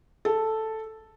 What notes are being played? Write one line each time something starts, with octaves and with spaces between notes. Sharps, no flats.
A4